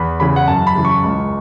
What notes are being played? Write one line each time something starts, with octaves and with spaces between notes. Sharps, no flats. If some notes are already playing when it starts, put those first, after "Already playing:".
Already playing: E2 B5
C#3 E3 B5
F#5
F#2 A5
B5
C#3 E3
C#6
C#2